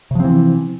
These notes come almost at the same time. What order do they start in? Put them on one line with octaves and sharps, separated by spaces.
C3 F3 C4 E3